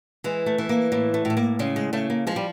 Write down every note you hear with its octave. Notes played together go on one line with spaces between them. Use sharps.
E3 G#3
A3
E3
A#3
A2 A#3
A3
A2
A3
A#3
C#3 G#3
G#3
C#3 A3
A#3
F3 G#3
G3